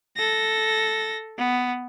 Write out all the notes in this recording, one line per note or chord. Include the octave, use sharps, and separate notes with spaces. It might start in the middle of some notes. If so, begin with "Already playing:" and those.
A4 A#6
B3